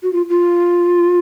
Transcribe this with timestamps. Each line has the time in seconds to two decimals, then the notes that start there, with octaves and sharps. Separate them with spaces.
0.03 F#4
0.13 F4
0.30 F4